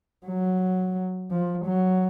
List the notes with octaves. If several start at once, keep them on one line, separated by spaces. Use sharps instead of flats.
F#3
F3
F#3